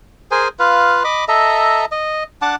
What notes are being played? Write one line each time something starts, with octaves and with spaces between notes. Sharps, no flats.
G#4 A#4 C5 G#5
F4 B4 F5
D#5 B5 D6
A4 D#5 E5 A#5
D#5
D4 F#5 A5 D6